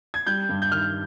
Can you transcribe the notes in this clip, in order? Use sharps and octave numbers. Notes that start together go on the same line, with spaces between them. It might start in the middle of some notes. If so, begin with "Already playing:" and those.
G#6
G3 G6
G2
G6
D#3 F6